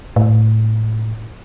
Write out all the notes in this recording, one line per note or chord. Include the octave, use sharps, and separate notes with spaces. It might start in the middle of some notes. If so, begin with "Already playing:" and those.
A2